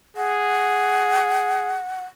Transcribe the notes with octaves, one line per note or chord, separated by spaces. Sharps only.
G#4 F#5